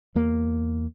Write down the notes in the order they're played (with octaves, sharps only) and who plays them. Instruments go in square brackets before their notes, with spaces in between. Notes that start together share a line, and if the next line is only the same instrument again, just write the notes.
[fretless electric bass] E2 A#3